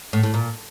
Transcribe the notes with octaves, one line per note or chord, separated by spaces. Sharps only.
A2
A2
A#2